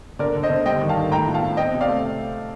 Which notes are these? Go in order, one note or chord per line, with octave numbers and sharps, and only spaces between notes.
D3 A#4 D5
D3
C5 D#5
D3
G3 D#5 G5
D#3
F5 A5
D#3
A2 G5 A#5
F3
F5 A5
F3
C4 D#5 G5
C3
D5 F5
A3